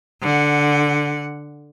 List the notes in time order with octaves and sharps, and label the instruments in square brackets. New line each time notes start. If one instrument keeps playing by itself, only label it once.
[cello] D3 F#5